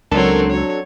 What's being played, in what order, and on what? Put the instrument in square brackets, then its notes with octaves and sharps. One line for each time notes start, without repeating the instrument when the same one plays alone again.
[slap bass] C#2 [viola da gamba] F#3 C4 C#5 [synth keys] D4 A4 [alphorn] A#4
[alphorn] F#3 [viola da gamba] C#5